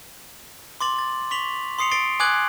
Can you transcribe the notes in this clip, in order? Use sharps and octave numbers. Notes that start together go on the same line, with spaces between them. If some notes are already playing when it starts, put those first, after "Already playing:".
C6 D6 A6 F#7
A6
C#6 B6 F7 F#7
C6 D#6 C7 C#7 F7
A6 C7 D7 G7
G#5 D6 D#6 F#6 G#6 F#7